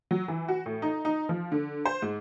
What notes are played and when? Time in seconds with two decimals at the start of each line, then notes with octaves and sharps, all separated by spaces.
0.11 F#3
0.28 E3
0.48 F#4
0.66 A2
0.82 D#4
1.05 D#4
1.29 F3
1.52 D3
1.85 C5
2.02 G#2